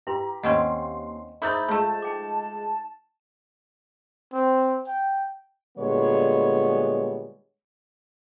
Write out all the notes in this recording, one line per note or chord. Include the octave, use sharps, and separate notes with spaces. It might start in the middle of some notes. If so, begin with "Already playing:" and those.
E4 G4 B4 A#5 C6
D#2 G3 C4 C#4 B4 D#5 F#5 C6
D#4 E4 G#4 C5 C6 D#6 G6 A6
F3 G#3 A3 A5
D#4 G5 D6
C4
G5
A#2 D3 G3 G#3 B3 C#5